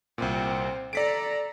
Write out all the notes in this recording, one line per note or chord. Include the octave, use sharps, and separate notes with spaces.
C2 A#2 C4 C5
A4 D5 A#5 B6 D7